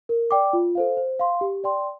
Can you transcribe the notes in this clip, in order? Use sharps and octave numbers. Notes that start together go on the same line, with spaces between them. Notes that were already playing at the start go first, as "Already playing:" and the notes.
A#4
D5 G5 D6
F4
A4 C5 F5
C5
F5 C6
G4
D5 G5 C6